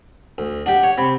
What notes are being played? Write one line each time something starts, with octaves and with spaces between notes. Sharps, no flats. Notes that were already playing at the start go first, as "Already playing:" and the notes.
D2
D4 G4 F#5
C#5
C3 B5